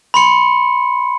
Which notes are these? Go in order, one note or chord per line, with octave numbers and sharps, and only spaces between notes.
B5 C6 C#7